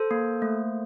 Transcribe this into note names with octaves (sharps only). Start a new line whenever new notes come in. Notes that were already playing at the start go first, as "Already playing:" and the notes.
Already playing: A4 C5
A#3
A3